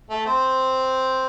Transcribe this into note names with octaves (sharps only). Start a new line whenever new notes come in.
A3 A4
C4 C5